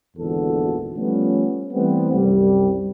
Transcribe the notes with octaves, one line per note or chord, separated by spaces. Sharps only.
G#1 E2 A#2 D3 F#4 A4
F3 G3 A3 B3 C#4
E3 G3 A3 B3 C4
C2 F#2 C3 G3